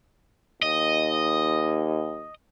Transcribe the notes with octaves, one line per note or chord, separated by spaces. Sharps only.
D#2 D#5